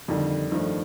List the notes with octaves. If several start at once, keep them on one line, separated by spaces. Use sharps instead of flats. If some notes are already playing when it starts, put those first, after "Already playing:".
F2 D3 D#3 G3
G2 D#3 F3 A3